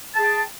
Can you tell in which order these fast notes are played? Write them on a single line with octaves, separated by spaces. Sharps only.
A5 G#4 G5